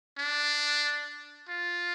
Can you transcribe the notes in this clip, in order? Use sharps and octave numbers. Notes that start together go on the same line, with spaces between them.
D4
F4